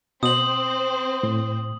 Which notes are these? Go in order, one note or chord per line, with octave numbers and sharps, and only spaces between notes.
B2 C4 C5 D#6 F#7
A2